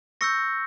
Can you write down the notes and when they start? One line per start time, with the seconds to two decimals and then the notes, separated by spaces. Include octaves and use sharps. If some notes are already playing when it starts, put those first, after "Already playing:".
0.21 C#6 E6 G6 A#6 C#7